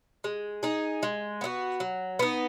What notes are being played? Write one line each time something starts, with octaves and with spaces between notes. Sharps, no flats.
G#3
D#4 G#4
G#3
B3 D#4 F#4
F#3
B3 D#4